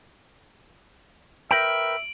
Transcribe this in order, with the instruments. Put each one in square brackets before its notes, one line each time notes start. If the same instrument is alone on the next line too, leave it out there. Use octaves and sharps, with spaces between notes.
[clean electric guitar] A#4 B4 G5 [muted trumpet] E5 [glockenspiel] D7 F#7